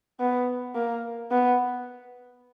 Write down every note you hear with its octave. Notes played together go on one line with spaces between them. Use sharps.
B3
A#3
B3